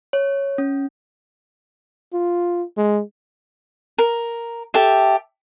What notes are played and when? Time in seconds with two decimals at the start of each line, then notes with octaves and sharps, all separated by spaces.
0.13 C#5
0.58 C#4
2.14 F4
2.77 G#3
3.98 A#4
4.74 G4 A4 E5